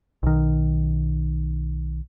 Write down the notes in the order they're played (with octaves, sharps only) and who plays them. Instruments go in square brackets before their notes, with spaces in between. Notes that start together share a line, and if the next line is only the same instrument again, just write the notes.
[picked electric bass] B1 D#3